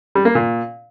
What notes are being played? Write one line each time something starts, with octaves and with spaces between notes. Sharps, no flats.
G3
A#3
A#2